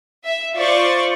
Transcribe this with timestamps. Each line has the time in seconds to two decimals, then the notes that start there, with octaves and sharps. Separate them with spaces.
0.25 E5
0.55 F4 C5 D5 C#6 A6